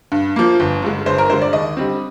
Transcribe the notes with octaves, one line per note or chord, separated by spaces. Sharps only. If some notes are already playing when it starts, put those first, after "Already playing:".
G2
F3 A#3
G1
G2 D3 G#3
G1 C5
A#4
G2 D3 G#3 C5
D5
D#2 D#5
D3 G3 C4